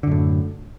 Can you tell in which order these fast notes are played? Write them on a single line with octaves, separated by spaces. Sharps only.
D3 F#2 A2